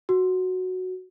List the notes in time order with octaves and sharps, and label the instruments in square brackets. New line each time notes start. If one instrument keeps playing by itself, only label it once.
[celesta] F#4